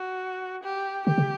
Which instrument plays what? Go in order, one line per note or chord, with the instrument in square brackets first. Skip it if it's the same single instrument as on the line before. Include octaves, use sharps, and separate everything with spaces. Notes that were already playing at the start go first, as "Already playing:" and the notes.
Already playing: [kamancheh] F#4
G4
[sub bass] D3 [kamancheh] G4
[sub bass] C#3